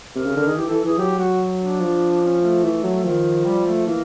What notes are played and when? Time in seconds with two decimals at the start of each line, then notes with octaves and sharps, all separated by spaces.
0.16 C3 A#4
0.26 C#3
0.36 D3 A#4
0.46 D#3 G#4
0.57 E3 G4
0.68 E3 A4
0.84 E3 G#4
0.98 F#3 G4
1.19 F#3 F#4
1.59 D4
1.81 F3
2.22 C#4
2.42 A3
2.63 E3
2.84 F#3
3.04 D#3 F3
3.45 G3
3.66 A3
3.86 E3 A#3